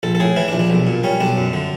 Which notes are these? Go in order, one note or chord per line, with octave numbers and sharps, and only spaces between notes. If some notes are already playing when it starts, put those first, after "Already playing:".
A#1 A4
A4
A2 G#4
E3 E4
D4
A#1
D4
B1
A#2
G3 C#4
B1 D4
F#2
D3